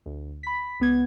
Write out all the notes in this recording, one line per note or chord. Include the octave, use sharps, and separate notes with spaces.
D2
B5 B6
C#2 B3 G#6